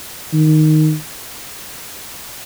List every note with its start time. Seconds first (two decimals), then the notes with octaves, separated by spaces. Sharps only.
0.33 D#3